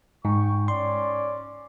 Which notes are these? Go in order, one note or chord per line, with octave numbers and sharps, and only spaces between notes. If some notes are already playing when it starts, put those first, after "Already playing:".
G#2 G5 C#6
C#4 D5 C6